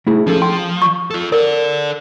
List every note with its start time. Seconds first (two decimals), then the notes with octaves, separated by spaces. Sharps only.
0.07 A3 E4 G#4
0.27 F3 C#4 G#4 A4
0.42 G5 C6
0.82 C#6
1.11 F4 A4
1.32 A4 A#4 D5